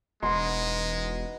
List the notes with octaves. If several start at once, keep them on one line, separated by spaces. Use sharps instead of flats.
E1 G#3 D#4 F#4 B4 C6